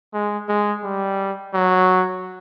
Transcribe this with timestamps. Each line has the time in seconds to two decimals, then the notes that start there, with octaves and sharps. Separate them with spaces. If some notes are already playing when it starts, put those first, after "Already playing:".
0.13 G#3
0.48 G#3
0.83 G3
1.54 F#3